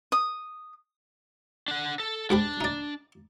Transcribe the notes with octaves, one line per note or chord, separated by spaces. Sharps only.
D#6
D4 F#5
A4
G#2 D4 G4 B5
D#4 D5